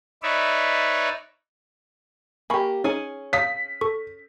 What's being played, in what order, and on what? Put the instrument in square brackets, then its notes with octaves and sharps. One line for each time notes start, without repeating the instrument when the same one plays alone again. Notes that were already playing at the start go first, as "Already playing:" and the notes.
[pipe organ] D#4 B4 C#5 D5 E5
[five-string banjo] A#3 G4 [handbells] G#5 B5 C#6
[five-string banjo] C#4 G#4 G#5 [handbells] D#4
[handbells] C#5 F5 D#6 [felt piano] B6
[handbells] A4 C#6